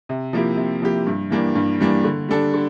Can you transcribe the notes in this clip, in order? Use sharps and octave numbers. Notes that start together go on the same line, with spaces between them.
C3
F3 A#3 E4 G4
C3
F3 A#3 E4 G4
G2
E3 G3 A#3 D4
G2
E3 G3 A#3 D4
D3
G3 D4 A4
D3